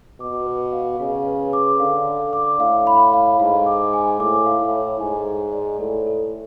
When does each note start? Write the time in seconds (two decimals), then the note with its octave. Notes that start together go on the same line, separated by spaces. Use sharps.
0.20 B2 D6
0.46 B4
0.73 F5
1.00 C#3 F5
1.26 B4
1.53 D6
1.80 D3 F5
2.07 F5
2.33 D6
2.60 A2 F5
2.87 B5
3.14 F5
3.40 G#2 F5
3.66 D6
3.93 G#5
4.20 A2 D6
4.46 F5
4.60 A2
4.73 C#5
5.00 G#2 G#5
5.26 G#5
5.53 D5
5.80 A2 A4
6.06 A4